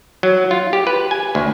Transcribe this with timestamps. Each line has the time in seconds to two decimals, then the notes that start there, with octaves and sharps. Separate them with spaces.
0.23 F#3
0.51 F4
0.73 G4
0.87 B4
1.11 G#5
1.35 D2